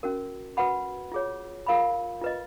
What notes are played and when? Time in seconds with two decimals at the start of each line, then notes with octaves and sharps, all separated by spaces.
0.03 C#4 F#4 A#4
0.57 F#4 B4 F#5 B5
1.12 F4 G#4 C#5
1.67 F4 A#4 F5 B5
2.21 F4 B4 D#5